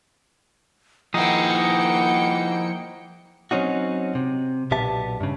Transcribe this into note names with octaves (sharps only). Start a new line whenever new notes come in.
F3 A#3 D#4 E4 G#4 F#5 G5 C#7
F#3 C4 C#4 D#4 F#4
C3
B1 A#2 B3 G4 E5 A5
G2 C#3